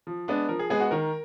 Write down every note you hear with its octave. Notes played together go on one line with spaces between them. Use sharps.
F3
G#3 B3 D4
F3 A#4
G#4
G#3 B3 G#4
F#4
D#3 A#4